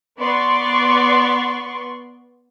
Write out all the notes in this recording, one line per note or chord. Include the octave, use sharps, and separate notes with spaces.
B3 D5 C6 C#6